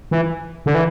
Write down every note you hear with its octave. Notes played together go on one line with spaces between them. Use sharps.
E3
D3
E3